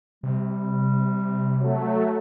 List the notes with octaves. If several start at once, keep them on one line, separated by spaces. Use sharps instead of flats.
C3 G3
F#3 A3